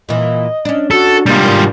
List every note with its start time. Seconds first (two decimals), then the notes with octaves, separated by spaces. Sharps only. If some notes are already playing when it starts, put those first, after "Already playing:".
0.09 A#2 E3 D#5
0.65 C#4 D4
0.91 F#4 A4
1.26 C3 G3 G#3 A#3 F4
1.43 G#2 C3 D#3 D4